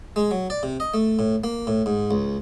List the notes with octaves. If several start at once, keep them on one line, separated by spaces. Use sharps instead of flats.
G#3
F#3
D5
C3
D#5
A3
A2
A#3
A2
G#2
C#2